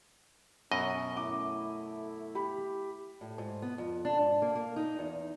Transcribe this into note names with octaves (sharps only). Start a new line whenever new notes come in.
F#2 B2 C#4 D#5
A3 E4 D6
G4 B5
A2
G#2
B3
F2
D4
G#2
A#3
A#3
D#4
E2